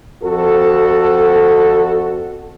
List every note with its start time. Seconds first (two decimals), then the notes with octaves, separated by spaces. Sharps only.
0.24 F2 F#4 A4